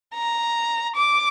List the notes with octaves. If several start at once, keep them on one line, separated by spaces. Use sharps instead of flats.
A#5
D6